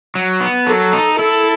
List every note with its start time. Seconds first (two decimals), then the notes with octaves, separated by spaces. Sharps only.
0.15 F#3
0.41 B3
0.67 F#3 A4
0.93 D#4
1.19 E4 A4